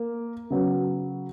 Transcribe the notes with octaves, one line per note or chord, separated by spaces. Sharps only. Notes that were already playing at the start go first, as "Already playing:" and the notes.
Already playing: A#3
C#3 F#3 B3